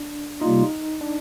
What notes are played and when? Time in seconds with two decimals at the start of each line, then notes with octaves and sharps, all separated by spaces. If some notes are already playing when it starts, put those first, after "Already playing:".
Already playing: D4
0.41 C3 G3 A#3 D#4 F4
1.01 D4